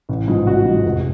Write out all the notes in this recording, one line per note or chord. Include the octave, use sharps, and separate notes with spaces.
A1
G#2 F3
A1 F#4
G#2
F3
F1